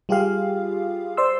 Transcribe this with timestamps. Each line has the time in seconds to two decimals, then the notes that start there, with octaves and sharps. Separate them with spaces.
0.09 G3 F4 G4 G#4 F5
1.17 C5 D5 C6 E6